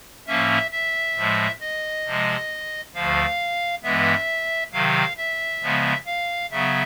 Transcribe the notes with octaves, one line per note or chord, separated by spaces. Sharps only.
A2 F3 A#3 C#4 E5
E5
A2 F3 G#3
D#5
C3 F3 G#3
D2 D3 F3 F5
G2 E3 G#3 B3 E5
C3 D#3 F#3 F5
E5
C#3 F3 G#3 B3
F5
C#3 F#3 B3 E5